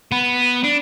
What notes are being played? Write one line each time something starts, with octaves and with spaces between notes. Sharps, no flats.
B3
D4